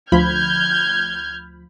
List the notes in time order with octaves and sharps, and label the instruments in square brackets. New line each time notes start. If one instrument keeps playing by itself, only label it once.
[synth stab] D2 F3 B5 [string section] F6 G6 G#6